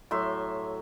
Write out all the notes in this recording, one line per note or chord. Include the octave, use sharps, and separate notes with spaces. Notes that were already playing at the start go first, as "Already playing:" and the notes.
A2 F#3 E5 C6